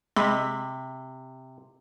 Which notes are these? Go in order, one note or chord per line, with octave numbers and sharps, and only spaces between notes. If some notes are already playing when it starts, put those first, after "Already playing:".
C3 G#3 B5